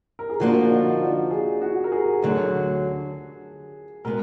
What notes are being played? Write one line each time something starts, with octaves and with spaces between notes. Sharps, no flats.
A#4
G#4
D3 F3 A#3 D4 F#4
D#4
F4
G#4
F#4
A#4
G#4
D2 D3 F#3
B2 G#3 B3 A#4